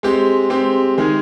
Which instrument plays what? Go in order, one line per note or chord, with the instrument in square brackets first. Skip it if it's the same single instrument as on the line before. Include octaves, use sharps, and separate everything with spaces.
[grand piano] G#3 C4 G4
G#3 C4 G4
D#3 G#3 D#4 G#4